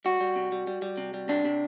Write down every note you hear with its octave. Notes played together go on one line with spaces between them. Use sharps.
G3 F#4
G3
C3
G3
G3
G3
C3
G3
C3 D4
C3